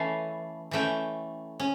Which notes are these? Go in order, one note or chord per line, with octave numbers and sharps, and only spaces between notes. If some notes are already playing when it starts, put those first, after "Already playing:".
Already playing: E3 A3 C#4 F5 A5
E3 A3 C#4 E5 G5
C#4